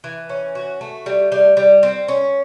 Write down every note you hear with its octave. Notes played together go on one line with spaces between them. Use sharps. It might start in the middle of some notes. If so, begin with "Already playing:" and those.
E3
C#4
F#4
A3
G3
G3
G3
C4
C#4